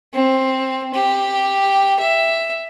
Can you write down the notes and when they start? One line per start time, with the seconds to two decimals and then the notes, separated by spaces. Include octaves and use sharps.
0.14 C4
0.94 G4
2.00 E5